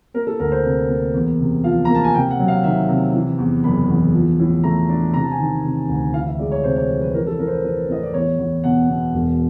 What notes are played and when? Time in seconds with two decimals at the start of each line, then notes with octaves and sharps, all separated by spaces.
0.14 A#3 A#4
0.27 A4
0.40 D2 A#4
0.52 C5
0.64 C3
0.89 A#3
1.14 E2
1.39 C3
1.64 F3 F5
1.85 A#3 A#5
1.95 A5
2.04 G#5
2.14 C3 G5
2.31 F#5
2.39 F#3
2.48 F5
2.64 D#3 E5
2.89 C3
3.14 E3
3.39 E2
3.64 F#1 B5
3.90 E2
4.14 F3
4.39 A2
4.64 A3 A#5
4.89 D4
5.14 C3 A#5
5.23 A5
5.31 G#5
5.39 D#3 A5
5.64 C3
5.89 D2
6.14 E3 F5
6.26 E5
6.39 G#3 D5
6.52 C#5
6.64 C3 C5
6.76 C#5
6.89 F2 B4
7.02 B4
7.14 E3 A#4
7.27 A4
7.39 A2 A#4
7.47 C5
7.51 B4
7.64 E3 B4
7.89 A2 D#5
8.03 D5
8.14 E2 C#5
8.39 E2
8.64 B2 F#5
8.89 B2
9.14 E1